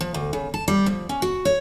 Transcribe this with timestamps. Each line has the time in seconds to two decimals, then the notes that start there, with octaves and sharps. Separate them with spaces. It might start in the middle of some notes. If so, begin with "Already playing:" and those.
0.01 F3
0.14 D2
0.33 C#3
0.54 A5
0.68 G3
0.86 F3
1.09 C#4
1.22 F#4
1.45 C#5